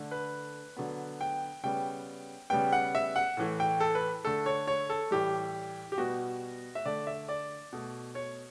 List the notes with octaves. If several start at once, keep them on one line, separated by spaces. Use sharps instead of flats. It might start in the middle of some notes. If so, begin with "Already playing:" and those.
Already playing: D3 A3
B4
D3 F#3 B3
G5
C#3 G3 B3 G5
C#3 G3 B3 G5
F#5
E5
F#5
A2 E3 A3
G5
A4
B4
D3 A3 A4
C#5
C#5
A4
A2 E3 G3 G4
G4
B2 G3 B3 F#4
E5
D3 A3 D5
E5
D5
B2 A3
C#5